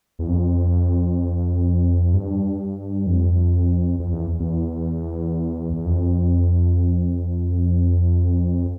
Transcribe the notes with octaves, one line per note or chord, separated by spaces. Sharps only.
E2
F2
G2
F2
F2
E2
E2
E2
F2